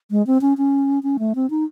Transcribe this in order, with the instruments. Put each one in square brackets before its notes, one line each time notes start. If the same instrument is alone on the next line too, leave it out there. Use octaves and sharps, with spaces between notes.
[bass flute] G#3
C4
C#4
C#4
C#4
A3
C4
D#4